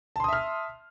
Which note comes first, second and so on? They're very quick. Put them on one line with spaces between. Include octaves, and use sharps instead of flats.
A5 C6 D#6 E5 F6